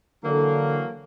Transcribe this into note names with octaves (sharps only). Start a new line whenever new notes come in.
D3 E3 F#3 A#3